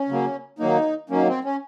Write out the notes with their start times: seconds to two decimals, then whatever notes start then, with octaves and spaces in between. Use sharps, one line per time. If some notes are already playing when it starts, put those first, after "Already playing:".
Already playing: C#4
0.09 C#3 F#3 A#3
0.59 D#3 F#3 A#3 D#4
1.09 D#3 F#3 A#3 C#4
1.28 C4
1.44 C#4